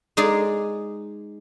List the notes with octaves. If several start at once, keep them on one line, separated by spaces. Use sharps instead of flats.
G#3 D#4 G#4 D5